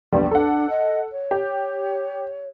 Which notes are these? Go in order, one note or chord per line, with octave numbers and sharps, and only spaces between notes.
A#1 E2 D3 G3
D4 A4 F#5
D#5
C#5
G4